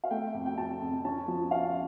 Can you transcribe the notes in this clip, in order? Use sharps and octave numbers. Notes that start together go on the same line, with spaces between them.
F5
A3 G5
F2
G5
F2 A5
F2
C#4 A5
F3
C#4 F5